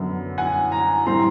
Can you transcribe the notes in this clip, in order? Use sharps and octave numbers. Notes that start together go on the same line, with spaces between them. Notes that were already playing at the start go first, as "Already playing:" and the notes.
Already playing: F#2 D3 F#3 B3
F#5 G#5
G#5 A#5
A2 E3 G3 C4 A#5 C6